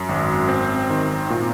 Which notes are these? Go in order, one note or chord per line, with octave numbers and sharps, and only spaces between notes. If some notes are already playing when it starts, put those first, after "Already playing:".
Already playing: F#2
G#1
C4
D#3
A#2